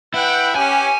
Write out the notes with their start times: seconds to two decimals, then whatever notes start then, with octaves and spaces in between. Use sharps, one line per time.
0.14 E4 B4 F#5 G5
0.56 C#4 G4 G#5